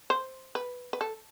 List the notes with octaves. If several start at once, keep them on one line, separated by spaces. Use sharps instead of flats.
C5
B4
B4
A4